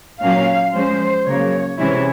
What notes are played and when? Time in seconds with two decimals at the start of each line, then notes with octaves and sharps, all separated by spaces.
0.21 A#2 F#3 A#3 C#4 F5
0.73 F3 G#3 C#4 C5
1.26 C#3 F#3 A#3 C#5
1.78 C3 E3 G#3 C#4 E4 C#5